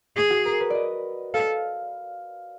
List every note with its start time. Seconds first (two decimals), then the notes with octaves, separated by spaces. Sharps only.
0.16 G#4
0.30 F#4
0.45 A#4
0.60 B4
0.70 D5 D#5
1.34 A4 F5